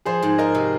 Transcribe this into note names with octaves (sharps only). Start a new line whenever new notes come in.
F3 G#4 C5
G#2
F4 A#4 D#5
C3